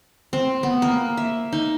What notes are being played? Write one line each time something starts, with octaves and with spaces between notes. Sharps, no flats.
C4
B3
A#3
E5
D#4